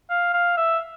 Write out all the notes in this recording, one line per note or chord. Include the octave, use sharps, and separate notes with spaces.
F5
F5
E5